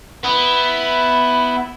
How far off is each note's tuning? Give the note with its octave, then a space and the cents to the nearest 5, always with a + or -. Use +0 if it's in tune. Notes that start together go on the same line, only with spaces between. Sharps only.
B3 +10 E4 +0